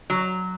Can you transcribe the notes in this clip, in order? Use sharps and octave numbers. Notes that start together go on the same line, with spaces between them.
F#3